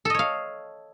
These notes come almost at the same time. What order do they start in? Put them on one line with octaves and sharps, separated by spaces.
A4 D#5 C#5 F5